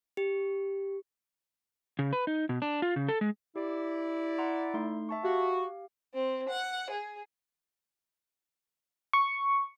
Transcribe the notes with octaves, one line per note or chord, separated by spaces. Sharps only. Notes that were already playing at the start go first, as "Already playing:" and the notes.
G4
C#3
B4
D#4
B2
D4
F4
C#3
A4
G#3
E4 G4 D5
F#5 A#5 C6
A3 D#4 C6
E5 A5 C#6
F#4 G4 F5
C4
F#5
G#4
C#6